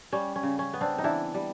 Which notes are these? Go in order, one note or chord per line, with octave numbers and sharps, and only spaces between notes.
G3 C#4
C#4
C#3
C#4
B3
C4 D4
D#4
E3 D4 E4
G3